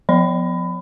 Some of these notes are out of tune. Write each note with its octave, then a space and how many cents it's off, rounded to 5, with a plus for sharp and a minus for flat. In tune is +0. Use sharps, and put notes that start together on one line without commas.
F3 +20 C#5 -5 B5 +25